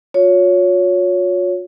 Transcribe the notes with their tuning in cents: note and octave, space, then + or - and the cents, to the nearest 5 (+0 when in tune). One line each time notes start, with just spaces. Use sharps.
F4 +45 C#5 +15